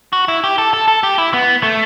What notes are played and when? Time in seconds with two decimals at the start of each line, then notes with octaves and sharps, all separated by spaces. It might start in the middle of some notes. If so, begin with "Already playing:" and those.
0.13 F#4
0.28 E4
0.44 G4
0.58 A4
0.73 A4
0.88 A4
1.03 G4
1.18 E4
1.34 B3
1.63 A3